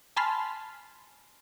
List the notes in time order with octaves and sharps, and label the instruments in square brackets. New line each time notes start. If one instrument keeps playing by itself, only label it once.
[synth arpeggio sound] G#5 A5 B5 C6 F6